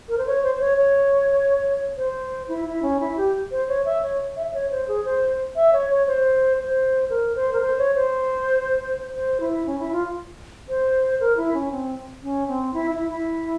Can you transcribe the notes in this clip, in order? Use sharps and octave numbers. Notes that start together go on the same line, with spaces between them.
A#4
C5
C#5
C5
C5
C#5
C#5
C5
E4
E4
C#4
E4
G4
C5
C#5
E5
C#5
E5
E5
C#5
C5
G#4
C5
E5
C#5
C#5
C5
C5
A#4
C5
A#4
C5
C#5
C5
C5
E4
C#4
E4
F4
C5
A#4
E4
C#4
C4
C#4
C4
E4
E4
E4